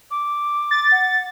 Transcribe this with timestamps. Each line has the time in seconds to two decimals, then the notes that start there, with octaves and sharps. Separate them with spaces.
0.11 D6
0.71 A6
0.92 F#5